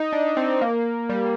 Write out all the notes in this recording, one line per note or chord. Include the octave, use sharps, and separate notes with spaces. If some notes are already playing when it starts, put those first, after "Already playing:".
Already playing: D#4
D4
C4
A#3
G3